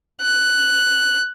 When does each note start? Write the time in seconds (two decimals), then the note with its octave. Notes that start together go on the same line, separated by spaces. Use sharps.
0.21 F#6